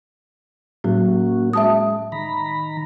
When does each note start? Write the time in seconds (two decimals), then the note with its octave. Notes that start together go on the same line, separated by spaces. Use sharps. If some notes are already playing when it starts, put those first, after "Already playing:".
0.84 A2 F#3 A#3 C#4 F#4
1.53 G#3 E5 A5 D#6
2.12 D#3 A#5 B5